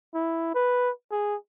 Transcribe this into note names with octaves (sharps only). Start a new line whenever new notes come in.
E4
B4
G#4